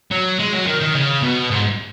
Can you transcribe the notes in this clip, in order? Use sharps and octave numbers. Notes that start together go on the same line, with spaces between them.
F#3
G#3
F#3
D#3
D#3
C#3
B2
G#2